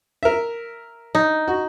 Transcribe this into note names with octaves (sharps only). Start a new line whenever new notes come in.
A#4 E5
D#4
F#4